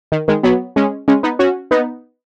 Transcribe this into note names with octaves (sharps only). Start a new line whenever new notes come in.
D#3
D#3 G#3
F#3 B3
G#3 C#4
G#3 C#4
B3 D#4
C#4 F#4
B3 D#4